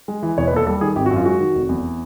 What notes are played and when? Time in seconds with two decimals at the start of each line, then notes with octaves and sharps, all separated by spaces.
0.08 G#3
0.22 E3
0.37 E1 C#5
0.47 B4
0.52 D#2 A4
0.66 G3 A4
0.81 D#3 G#4
0.96 G#1 G4
1.06 F#4
1.11 F#2
1.16 F4
1.25 G#3 F#4
1.40 D#3
1.55 F1
1.69 E2